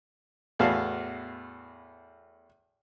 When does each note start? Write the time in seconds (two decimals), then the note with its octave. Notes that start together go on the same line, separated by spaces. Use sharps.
0.59 E2 A2 B3 F#4 F5 A5